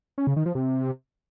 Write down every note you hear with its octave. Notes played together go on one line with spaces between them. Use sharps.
C#4
C#3
D#3
F3
C3